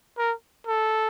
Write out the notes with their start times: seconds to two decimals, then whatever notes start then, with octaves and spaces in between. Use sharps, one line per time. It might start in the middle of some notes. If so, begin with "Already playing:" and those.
0.18 A#4
0.66 A4